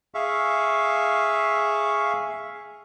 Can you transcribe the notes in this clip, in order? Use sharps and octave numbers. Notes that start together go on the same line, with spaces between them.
G#4 E5 F5 C#6